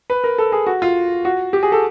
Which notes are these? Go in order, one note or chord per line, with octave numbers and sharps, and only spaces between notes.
B4
A#4
A4
G#4
F#4
F4
F#4
G4
G#4
A4